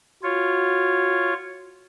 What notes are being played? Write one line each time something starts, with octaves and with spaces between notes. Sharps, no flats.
F4 F#4 C#5